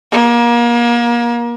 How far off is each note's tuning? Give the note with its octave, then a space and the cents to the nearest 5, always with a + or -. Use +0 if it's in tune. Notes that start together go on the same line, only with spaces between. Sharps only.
A#3 +30